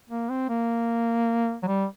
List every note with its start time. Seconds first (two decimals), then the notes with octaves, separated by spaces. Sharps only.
0.10 A#3
0.29 C4
0.49 A#3
1.63 F#3
1.68 G3